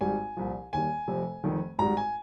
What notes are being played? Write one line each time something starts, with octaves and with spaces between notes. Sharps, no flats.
G#1 G#2 G3 G#5
C2 A#2 F3
D#2 D#3 G3 G#5
F1 F2 C3
F1 F2 D#3
G#1 G#2 G3 A#5
G#5